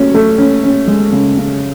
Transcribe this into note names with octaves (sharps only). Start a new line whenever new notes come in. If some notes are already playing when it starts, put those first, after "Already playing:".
Already playing: F#3 A3 C#4
A3
C#4
C#4
G#3
C#3
C#3